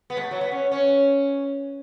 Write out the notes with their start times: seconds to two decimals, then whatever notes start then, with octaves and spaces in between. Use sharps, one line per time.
0.10 B3
0.17 G#3
0.21 A3
0.31 F#3
0.41 B3
0.51 C#4
0.72 C#4